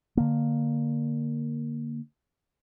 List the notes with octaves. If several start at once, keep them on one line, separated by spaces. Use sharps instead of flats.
D3 A#3